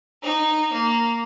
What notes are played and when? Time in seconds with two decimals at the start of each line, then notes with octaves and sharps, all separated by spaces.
0.23 D#4
0.73 A#3